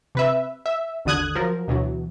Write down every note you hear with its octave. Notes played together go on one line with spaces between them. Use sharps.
C3 B4 E5
E5
G#1 D#2 D3 D#6 F#6 G#6
F3 F#3 A#4
D2 B2 E3 F#3